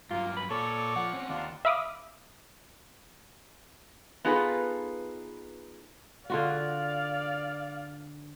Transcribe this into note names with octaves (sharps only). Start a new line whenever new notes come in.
G2 F#3 A#3 F4
B5
A#2 A4 C#5 D5
F3 F#5
C4 C#4
D#2 D4 F4
E5 F5 B5 D6 D#6
B3 D#4 F4 G#4 A4 B4
D3 F4 F#4 D5 F5